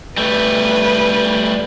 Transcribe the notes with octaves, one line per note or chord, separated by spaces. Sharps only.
G3 A3 B4